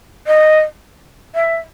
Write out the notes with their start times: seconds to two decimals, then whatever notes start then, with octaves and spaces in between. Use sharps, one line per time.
0.26 D#5
1.34 E5